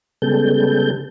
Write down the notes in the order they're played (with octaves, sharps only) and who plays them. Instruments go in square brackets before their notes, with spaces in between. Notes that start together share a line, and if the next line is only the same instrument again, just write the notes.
[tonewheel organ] C#3 G3 G#3 B3 A4 G6